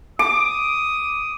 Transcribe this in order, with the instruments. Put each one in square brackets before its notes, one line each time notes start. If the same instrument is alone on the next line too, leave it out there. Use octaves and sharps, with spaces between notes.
[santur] D6 [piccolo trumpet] D#6